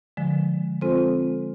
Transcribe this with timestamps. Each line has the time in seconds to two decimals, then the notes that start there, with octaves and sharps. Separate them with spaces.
0.17 D3 F3 G#3
0.81 G#3 C4 F4 A4 C5